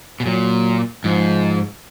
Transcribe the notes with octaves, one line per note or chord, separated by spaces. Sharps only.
B2
A#2 F#3
G#2 F3